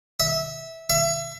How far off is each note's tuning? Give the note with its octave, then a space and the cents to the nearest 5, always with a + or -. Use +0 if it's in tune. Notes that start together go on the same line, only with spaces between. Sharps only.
E5 -15
E5 +30